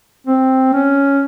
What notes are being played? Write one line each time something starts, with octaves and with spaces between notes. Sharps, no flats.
C4
C#4